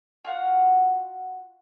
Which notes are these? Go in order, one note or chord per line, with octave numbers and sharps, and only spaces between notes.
F4 F#4 F5 F#5